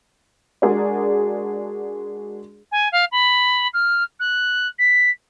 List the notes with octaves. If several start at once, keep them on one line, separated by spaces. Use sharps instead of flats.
G#3 D4 F#4 G#4 A#4 D5
G#5
F5
B5
F6
F#6
B6